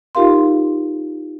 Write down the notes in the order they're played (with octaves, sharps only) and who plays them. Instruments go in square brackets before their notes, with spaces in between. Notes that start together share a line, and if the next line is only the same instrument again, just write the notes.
[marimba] D#4 F4 G4 A#4 F5 C6